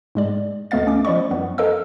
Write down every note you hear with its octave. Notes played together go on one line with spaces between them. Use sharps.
G#2 G#3 D5
D2 A3 B3 D#5 F5 A6
C#4 D6
F3 E4 D5 D#5 C#6
F#2 F3 B3
A4 A#4 D#5 F5 E6